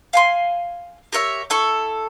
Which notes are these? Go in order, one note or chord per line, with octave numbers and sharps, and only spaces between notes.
F5 G#5 C6
G4 A#4 C#5 E5
E4 A4 C#6